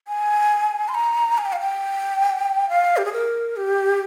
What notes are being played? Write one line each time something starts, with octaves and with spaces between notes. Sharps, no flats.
G#5
C6
A#5
G#5
G5
F5
G5
F5
G4
G#4
A#4
G4